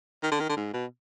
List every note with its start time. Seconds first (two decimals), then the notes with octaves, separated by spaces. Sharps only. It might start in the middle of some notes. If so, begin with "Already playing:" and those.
0.23 D#3
0.32 D3
0.40 D#3
0.49 D3
0.57 G#2
0.73 B2